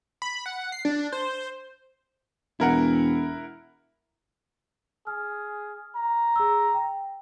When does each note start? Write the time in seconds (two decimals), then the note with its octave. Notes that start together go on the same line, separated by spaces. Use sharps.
0.22 B5
0.46 F#5
0.72 C7
0.85 D4
1.12 C5
2.60 E1 E4 A#4 F#5
5.07 G#4 F6
5.96 A#5
6.36 G#4 E6
6.74 G5